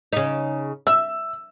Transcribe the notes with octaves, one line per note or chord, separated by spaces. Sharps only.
C#3 D#4
E5 E6